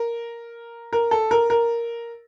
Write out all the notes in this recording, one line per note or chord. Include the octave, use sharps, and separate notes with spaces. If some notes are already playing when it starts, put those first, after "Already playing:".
Already playing: A#4
A#4
A4
A#4
A#4